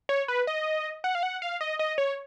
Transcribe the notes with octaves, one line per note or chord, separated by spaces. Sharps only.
C#5
B4
D#5
F#5
F5
F#5
F5
D#5
D#5
C#5